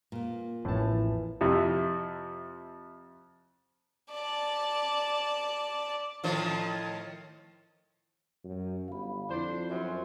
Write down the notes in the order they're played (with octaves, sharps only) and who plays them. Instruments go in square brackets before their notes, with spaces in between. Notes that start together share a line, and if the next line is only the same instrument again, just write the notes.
[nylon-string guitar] A#2 A#3
[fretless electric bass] A1 F2 [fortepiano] A2 A5 [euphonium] E3
[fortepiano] F2 C3 E4
[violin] D5 A5
[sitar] A2 D#3 F3
[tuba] F#2
[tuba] G1 [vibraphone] F5 B5
[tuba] F2 [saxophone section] D4 C5 [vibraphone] E4
[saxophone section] F#2 [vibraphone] C5 C6